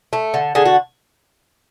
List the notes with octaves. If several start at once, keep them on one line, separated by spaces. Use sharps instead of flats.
A3
D3
D3 G#4
F#4